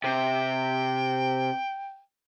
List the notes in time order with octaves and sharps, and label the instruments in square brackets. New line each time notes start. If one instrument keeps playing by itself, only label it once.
[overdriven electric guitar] C3 [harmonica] G5